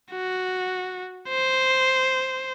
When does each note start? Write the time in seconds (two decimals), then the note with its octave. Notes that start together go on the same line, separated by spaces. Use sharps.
0.11 F#4
1.29 C5